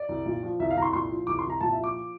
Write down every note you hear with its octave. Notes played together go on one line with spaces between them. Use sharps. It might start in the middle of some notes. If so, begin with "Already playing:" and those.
Already playing: D5
C2
A#2
F3
C2 E5
F5
C2 A#5
C6
A#2 C6
F3
C2 D6
C6
C2
A#5
A#2 A5
E5
F3
D6